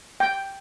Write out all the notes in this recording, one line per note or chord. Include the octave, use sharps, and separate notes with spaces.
G5